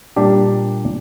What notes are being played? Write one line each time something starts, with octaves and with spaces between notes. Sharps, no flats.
A#2 G3 D4 G4